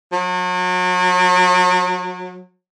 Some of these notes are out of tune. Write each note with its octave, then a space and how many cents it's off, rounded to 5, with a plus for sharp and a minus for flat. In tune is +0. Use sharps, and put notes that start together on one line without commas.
F#3 -35